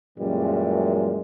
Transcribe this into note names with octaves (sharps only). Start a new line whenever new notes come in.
F#2 A#2 E3 G3 G#3